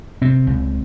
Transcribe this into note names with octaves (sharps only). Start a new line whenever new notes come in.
C3 C4
C#2